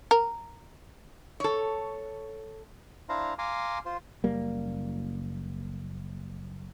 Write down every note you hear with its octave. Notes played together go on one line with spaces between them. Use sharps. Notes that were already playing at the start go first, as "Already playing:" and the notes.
A#4
A4 C#5
D4 E4 C5 F5 A#5
F5 G#5 A#5 C6 D6
F4 C5
F#1 G3 A#3